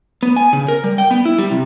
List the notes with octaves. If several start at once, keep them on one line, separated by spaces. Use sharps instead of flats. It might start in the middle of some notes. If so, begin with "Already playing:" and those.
B3
G#5
C#3
A#4
G3
G5
B3
E4
G3
C3